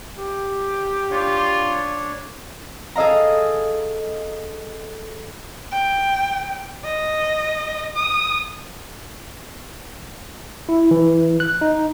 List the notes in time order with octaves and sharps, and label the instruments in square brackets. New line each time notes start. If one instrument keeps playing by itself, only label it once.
[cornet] G4
[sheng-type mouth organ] D4 C#5 [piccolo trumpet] F4
[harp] G#4 A4 D#5 F5 A#5
[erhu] G5
D#5
D#6
[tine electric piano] E4
E3
F#6
D#4